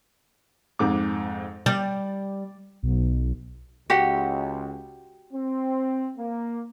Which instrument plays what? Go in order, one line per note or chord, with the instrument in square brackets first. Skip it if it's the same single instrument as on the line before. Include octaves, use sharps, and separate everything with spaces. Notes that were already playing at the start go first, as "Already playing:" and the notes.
[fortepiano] F2 G#2 D6
[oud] G3 [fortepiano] D5
[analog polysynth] B1
[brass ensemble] C#2 [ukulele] F#4 G4 F#5
[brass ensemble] C4
A#3